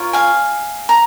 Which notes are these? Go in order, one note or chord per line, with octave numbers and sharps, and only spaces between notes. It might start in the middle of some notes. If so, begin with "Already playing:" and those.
Already playing: F4 A#4 C#5
F5 G#5
A#5